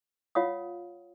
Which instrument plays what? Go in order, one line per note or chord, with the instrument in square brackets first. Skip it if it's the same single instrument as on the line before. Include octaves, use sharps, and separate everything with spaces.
[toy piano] F4 C#5 F5 F#5 D#6